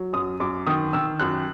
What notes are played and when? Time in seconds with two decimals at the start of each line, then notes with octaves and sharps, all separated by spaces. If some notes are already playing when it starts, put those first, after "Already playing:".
Already playing: F#3
0.13 F#2 D#6
0.40 F#2 D6
0.67 D#3 D#6
0.93 D#3 E6
1.20 F#2 F#6